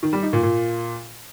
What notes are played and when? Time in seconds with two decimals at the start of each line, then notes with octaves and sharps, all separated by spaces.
0.03 D#3
0.13 G3
0.23 D#4
0.33 A#2
0.43 A#2